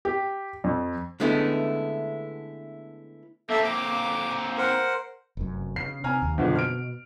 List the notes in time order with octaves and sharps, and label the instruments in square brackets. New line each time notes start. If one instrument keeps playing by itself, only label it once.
[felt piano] G4
F2
[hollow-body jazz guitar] D3 G#3 A3 B3 C#4 E4
[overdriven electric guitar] A#3 C4 [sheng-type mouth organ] A4 E5
[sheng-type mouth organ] D6
A#4 C5 F#5
[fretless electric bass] F1 F#2
[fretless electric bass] C#3 [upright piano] C7
[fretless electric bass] C3 [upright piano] G#5 A#5 F6
[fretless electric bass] D#2
[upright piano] F#1 D3 F3 [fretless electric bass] B2
[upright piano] F6 D7